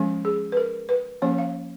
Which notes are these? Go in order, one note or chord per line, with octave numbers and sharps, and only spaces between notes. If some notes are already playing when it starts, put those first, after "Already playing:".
Already playing: F3 G#3 C#4
G#4
B4
A#4
B4
F3 A#3 C#4 C#5
F5